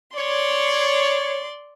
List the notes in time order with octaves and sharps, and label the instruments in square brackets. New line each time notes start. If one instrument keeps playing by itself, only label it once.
[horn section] C#5 [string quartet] D5 C6